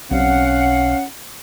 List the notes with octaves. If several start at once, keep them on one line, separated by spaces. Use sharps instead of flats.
B1 C4 C#4 F5 F#5